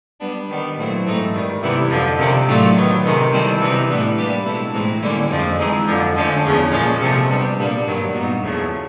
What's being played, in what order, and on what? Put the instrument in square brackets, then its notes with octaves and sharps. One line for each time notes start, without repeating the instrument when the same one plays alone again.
[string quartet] G3 B3 D4
D#3 G3 B3
A#2 F#3 A3 C4 E4
G#2 E3 A3 C4 D#4
G2 D#3 G3
C3 E3 G3 B3 E4
F2 D3 F3
C3 D#3 G3 A#3
A2 F#3 A3 D4 F4
D#3 F#3 B3
C3 D#3 G#3
D#3 G3 C4 E4 A4
C3 E3 G3 B3 D#4
A2 E3 G3 B3 D4
G3 A#3 D4 G4 B4
B2 G#3 C4 E4 A4
A2 E3 G#3 C4 D#4
D3 G3 A#3 C#4 E4
F2 D3 F3 G#3 C4
E3 G#3 C4 D#4 G#4
F2 D3 F3
D3 F3 A3 C#4
E2 C#3 F3
A#2 F3 G#3 C#4
C3 F3 A3
G3 B3 D4
A#2 G3 B3 D4
G2 D#3 F#3
A#2 G3 B3 D#4 F#4
E2 C#3 F3 A3